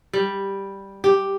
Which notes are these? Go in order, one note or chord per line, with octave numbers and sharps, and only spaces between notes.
G3
G4